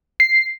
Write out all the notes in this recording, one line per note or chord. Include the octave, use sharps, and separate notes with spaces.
C7